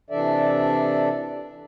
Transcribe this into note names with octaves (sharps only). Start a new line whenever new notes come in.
C3 E3 D4 A4 D5 E5